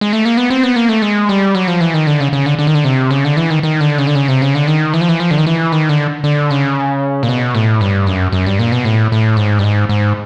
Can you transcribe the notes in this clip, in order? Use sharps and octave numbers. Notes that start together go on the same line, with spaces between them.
G#3
A3
A#3
B3
C4
B3
A#3
A3
G#3
G3
F#3
F3
E3
D#3
D3
C#3
C#3
D3
D3
D#3
D3
C3
C#3
D3
E3
D#3
D#3
D3
C#3
D3
C#3
C3
C#3
D3
D#3
E3
F3
E3
F3
D3
D#3
E3
D#3
D3
D3
C#3
A#2
B2
A2
G2
F#2
F#2
G2
A#2
B2
A2
A2
G#2
G2
G#2
G#2